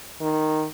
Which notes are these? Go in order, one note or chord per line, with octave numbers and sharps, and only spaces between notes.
D#3